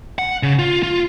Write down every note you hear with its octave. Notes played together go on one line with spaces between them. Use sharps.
F#5
C#3
F4
F4